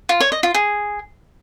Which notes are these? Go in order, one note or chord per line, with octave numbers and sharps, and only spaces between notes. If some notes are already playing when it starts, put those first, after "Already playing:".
F4
C#5
D#5
F4
G#4